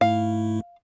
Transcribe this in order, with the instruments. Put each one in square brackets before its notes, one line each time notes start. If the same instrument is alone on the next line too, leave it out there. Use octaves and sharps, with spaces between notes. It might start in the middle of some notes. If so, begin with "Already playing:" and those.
[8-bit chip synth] G#2 A3 E4 [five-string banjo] F5